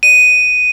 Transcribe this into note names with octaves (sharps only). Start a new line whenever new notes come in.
D#7